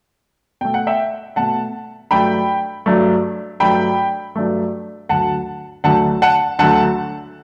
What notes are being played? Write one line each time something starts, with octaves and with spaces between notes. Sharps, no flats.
B2 A3 G5
F#5
E5 G5
B2 A3 F#5 A5
G2 F#3 A3 G5 B5
G2 F#3 A3
G2 F#3 A3 G5 B5
G2 F#3 A3
D2 D3 F#3 A3 F#5 A5
D2 D3 F#3 A3 F#5 A5
F#5 A5
D2 D3 F#3 A3 F#5 A5